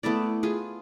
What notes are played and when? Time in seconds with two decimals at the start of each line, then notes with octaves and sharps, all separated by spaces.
0.03 A3 B3 E4 D5
0.43 F4 G#4